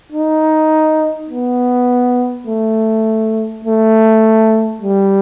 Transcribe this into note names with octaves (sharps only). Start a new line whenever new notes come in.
D#4
B3
A3
A3
G3